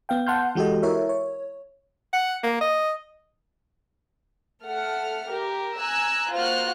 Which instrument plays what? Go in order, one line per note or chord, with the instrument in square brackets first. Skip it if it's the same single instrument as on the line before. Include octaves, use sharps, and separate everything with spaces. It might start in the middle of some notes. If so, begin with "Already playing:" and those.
[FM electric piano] B3 F5 G5
F#5 A5 C6 F6 G6
E3 G#3 F#4 G4 A4 D#5
E4 A#4 C#5 E5
C#5
[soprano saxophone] F#5
A#3
D#5
[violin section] A3 A4 F#5 F6
G4 A#4
G#5 A#5 E6 F#6
A#3 F4 F#4 C5 F6 F#6